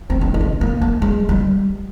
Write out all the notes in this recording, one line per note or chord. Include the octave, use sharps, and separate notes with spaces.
C4
D4
D#4
D4
A#3
A#3
G#3
G3